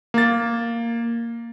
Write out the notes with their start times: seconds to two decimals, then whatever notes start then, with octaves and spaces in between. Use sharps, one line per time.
0.14 A#3 A6